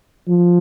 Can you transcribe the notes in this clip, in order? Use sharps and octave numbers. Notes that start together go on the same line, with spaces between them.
F3